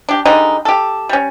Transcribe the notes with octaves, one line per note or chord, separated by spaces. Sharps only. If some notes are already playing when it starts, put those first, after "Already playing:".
D4 G4
D3 G3 G#3 D#4
G4 A4
G3 C#4